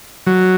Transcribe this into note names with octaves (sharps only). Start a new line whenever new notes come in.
F#3